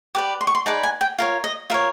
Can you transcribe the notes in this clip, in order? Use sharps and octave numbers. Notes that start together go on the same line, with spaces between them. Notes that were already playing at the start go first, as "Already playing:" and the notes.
G4 B4 D5 D6
C6
C#6
C6
D#4 G#4 B4 D5 A5
G#5
G5
F4 A#4 C#5 F5
D#5
F4 A#4 C#5 E5